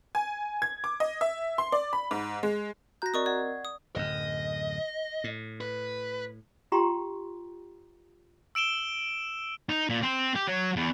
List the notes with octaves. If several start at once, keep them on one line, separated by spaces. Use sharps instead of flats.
G#5
G#6
D6
D#5
E5
C6
D5
B5
G#2
G#3
F#4 A#5 F#6 G6 A#6
C4 A#4 D5 D#5 C#6 D#6
D5 F#5 G#6
D#6
D1 F#2 D#5
A2
B4
F4 G4 G5 A#5 C6 C#6
E6 D7 E7 G7
D#4
A#2
C4
G4
F#3
E2